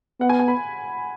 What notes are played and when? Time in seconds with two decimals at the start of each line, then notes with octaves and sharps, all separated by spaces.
0.20 B3 F#5
0.29 G#5
0.40 G#5
0.48 B5